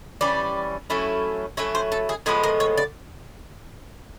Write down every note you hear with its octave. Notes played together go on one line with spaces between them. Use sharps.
E3 G3 C#4 D5
F#3 A3 C#4 E4
F#3 A3 C#4 E4 C#5
C5
A4
G#4
A2 F3 G#3 B3 G#4
A#4
C#5
D5